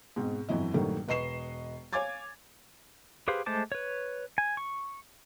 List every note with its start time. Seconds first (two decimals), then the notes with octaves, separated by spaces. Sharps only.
0.16 G#2 B2 C4
0.49 G1 F2 E3 F#3 E4 D#5
0.74 A#1 G2 D#3 F#3 G3 A3
1.08 E1 B4 D#5 C#6 C7 E7
1.93 C#5 F5 G#5 D6 G#6 A6
3.28 G4 G#4 B4 C5 F5
3.46 G#3 A3 C5 A5 D6
3.72 B4 C#5
4.38 G#5
4.57 C#6